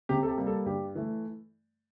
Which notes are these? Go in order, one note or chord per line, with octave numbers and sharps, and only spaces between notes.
C3 G4
A4
G4
G3 A#3
A4
G2 G4
E3 A3